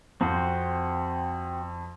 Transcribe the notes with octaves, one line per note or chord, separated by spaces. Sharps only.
F2 C4 F#4 C5